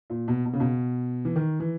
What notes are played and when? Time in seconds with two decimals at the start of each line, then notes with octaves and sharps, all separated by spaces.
0.10 A#2
0.28 B2
0.46 B2
0.53 C#3
0.60 B2
1.25 E3
1.36 D#3
1.60 E3